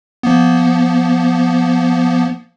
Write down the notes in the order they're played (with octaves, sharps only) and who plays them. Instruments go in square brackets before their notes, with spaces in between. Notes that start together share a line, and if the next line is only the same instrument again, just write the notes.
[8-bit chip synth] F3 A#3 B3